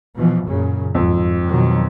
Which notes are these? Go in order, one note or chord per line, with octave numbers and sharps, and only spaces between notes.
B2 E3 F3
F#2 A#2 C#3
G#1 F2
B2 D#3 F#3